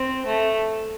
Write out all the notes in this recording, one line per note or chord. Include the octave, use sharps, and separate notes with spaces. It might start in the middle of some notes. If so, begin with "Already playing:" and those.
Already playing: C4
A3